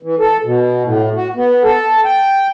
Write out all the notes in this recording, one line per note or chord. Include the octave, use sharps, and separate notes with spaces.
E3
A4
B2
A2
F#4
B3
A4
G5